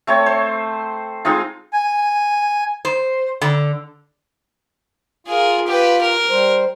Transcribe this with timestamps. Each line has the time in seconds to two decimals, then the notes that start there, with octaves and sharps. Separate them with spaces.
0.07 A3 C4 A4 C#5
0.26 C5
1.25 G#3 C4 D#4 F4
1.73 G#5
2.85 C5
3.42 D3
5.27 F4 G#4 A#4
5.67 G4 B4
6.01 A#4
6.30 G3 C5